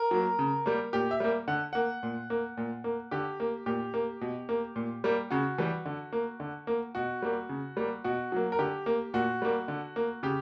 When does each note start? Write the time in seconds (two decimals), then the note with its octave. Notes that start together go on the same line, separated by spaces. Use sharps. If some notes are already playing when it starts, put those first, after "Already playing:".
Already playing: A#4
0.11 F#3 A#3
0.39 C#3
0.66 G3 A#3
0.93 A#2 G4
1.11 E5
1.20 G3 A#3
1.48 D3 F#5
1.73 A#3 F#5
2.03 A#2
2.30 A#3
2.57 A#2
2.84 A#3
3.11 D3 G4
3.40 A#3
3.66 A#2 G4
3.94 A#3
4.21 B2
4.49 A#3
4.76 A#2
5.04 G3 A#3
5.30 C#3 F#4
5.58 E3 G3
5.86 D3
6.13 A#3
6.40 D3
6.67 A#3
6.95 B2 F#4
7.22 G3 A#3
7.49 C#3
7.77 G3 A#3
8.04 B2 F#4
8.32 F#3 A#3
8.52 A#4
8.59 D3 G4
8.86 A#3
9.14 A#2 F#4
9.42 G3 A#3
9.68 D3
9.96 A#3
10.23 C#3 G4